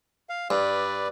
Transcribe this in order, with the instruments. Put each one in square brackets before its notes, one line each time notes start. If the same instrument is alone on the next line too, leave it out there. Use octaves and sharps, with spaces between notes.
[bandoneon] F5
[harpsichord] G2 [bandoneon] B4 D5